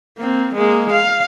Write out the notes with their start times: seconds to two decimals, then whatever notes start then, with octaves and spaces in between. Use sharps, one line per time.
0.18 A#3 C4
0.55 G#3 A#3
0.92 F5